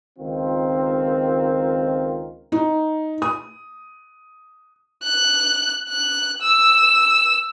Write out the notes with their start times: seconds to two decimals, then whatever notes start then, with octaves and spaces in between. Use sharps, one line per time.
0.19 C#2 D#3 C4 F4 A#4
2.52 D#4
3.22 D#6
5.04 F#6
5.90 F#6
6.42 E6